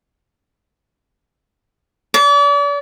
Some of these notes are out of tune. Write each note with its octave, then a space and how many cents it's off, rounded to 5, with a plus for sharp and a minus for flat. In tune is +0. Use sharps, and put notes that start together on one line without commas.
D5 -40